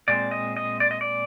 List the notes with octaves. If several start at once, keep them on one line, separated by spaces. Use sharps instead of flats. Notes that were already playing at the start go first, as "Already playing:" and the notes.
A#2 G#3 C4 D5
D#5
D#5
D5
D#5
D5